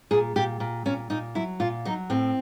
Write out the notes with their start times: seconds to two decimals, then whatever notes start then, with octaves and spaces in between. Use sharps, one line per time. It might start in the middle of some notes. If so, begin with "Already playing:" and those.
0.11 A#2 G#4
0.36 A#2 G4
0.60 A#2
0.86 A#2 C#4
1.10 A#2 D#4
1.35 F#3 E4
1.60 A#2 F4
1.85 F#3 D#4
2.10 A2 C4